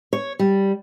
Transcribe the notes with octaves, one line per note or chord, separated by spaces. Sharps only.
C#5
G3